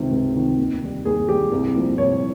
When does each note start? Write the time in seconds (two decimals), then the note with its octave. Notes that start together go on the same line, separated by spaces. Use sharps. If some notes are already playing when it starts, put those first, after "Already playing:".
Already playing: C#2 C3 D#3
0.11 C#2
0.35 C3 D#3
0.58 D#2
0.82 D#3 G3
1.05 D#2 G#4
1.29 D#3 G3 G4
1.52 C2
1.75 A#2 F3
1.98 C2 C#5